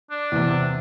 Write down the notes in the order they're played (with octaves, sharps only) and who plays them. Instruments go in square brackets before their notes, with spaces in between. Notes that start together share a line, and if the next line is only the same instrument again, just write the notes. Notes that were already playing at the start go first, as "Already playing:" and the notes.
[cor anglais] D4
[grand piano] E2 C3